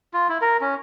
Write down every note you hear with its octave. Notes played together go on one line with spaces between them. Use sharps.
F4
E4
A#4
C#4